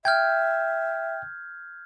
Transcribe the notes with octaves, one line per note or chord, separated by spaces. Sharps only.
E5 G5 F6 G6 G#6